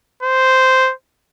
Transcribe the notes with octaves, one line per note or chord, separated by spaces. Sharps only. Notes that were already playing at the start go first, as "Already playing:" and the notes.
C5